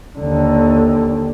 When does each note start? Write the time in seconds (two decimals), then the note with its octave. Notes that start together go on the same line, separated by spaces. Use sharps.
0.19 D#2 D3